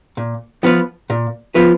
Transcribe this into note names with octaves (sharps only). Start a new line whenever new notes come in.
A#2
F3 B3 F4 B4
A#2
F3 B3 F4 B4